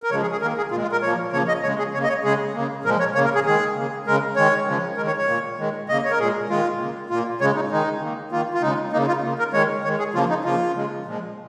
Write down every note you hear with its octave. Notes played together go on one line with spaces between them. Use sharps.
A#4
C#3 F3 G#3 C#5
G#4
G#4
D#3 A#3 A#4
G#4
A#2 G#3 F4
F4
A#4
A#2 F3 A#3 C#5
C#3 F3 A#3 C#5
D#5
C#3 G#3 C#5
G#4
C#3 A#3 C#5
D#5
C#5
C#3 G#3 G#4
C#3 A#3
A#2 F3 G#3 A#4
C#5
C#3 A#3 C#5
A#4
G#4
D#3 G#3 G#4
C#3 A#3
C#3 G#3 A#4
D#3 G#3 C#5
C#3 F3 G#3
D#3 G#3 A#4
C#5
C#5
A#2 A#3
D#3 G#3
C#3 A#3 D#5
C#5
A#4
A#2 G#3 G#4
D#3 G#3 F4
C#3 A#3
A#2 A#3 F4
C#3 G#3 C#5
D#4
D#3 G#3 D#4
D#3 A#3
D#3 A#3 F4
F4
C#3 G#3 D#4
C#3 A#3 D#4
F4
C#3 A#3
A#4
D#3 G#3 C#5
D#3 G#3 C#5
G#4
C#3 F3 A#3 F4
D#4
C#3 F3 A#3 F4
C#3 G#3
A#2 F3 G#3